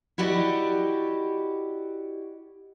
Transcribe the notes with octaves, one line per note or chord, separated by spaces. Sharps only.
E4 F#4 G4 D5 D#5